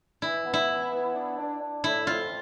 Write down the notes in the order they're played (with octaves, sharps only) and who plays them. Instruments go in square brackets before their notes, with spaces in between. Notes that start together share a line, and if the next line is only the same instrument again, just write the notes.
[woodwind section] E3 [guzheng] E4
[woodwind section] B3
[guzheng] E4
[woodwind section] E3
B3
D4
D4
D4
[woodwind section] A2 [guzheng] E4
[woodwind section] F2 [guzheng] F4